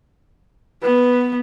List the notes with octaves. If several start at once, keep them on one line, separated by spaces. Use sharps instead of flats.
B3 B4